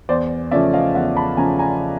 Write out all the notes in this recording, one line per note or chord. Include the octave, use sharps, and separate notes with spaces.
E2 C5 D5
C#3 F3 A3 C#4 D5 E5
D#5 F5
E2 E5 F#5
A5 B5
C#3 F3 A3 C#4 G#5 A#5
G#5 A#5